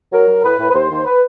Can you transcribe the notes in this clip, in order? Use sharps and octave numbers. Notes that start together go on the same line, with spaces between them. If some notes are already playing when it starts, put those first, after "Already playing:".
F#3 A#4
F#3
A2 B4
A2
B4
D#2 C5
D#2
B4